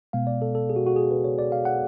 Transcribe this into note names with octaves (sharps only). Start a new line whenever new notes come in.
B2 G#3 B3 F5
D5
A4
A4
G#4
F#4
F#4
G#4
B4
C#5
D5
F5
F#5